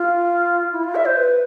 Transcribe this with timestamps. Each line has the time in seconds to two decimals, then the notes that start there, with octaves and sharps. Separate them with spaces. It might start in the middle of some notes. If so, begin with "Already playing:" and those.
Already playing: F4
0.73 E4
0.84 F4
0.95 E5
1.05 C5
1.17 B4